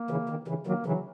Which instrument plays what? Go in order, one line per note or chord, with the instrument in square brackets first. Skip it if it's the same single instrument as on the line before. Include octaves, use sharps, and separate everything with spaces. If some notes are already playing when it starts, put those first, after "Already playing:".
Already playing: [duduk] A#3
[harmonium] C#3 E3
D#3
C#3 E3
[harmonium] D#3 F#3 [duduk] A#3
[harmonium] C#3 E3 [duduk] F#3